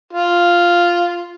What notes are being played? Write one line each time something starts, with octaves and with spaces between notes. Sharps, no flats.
F4